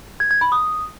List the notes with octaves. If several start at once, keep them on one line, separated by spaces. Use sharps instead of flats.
G#6
G#6
B5
D#6